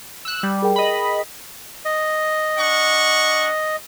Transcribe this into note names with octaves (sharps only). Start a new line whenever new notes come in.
E6 F#6
G3
G#4 A#4 G5
D#5 B5
D#5
D4 F#5 C#6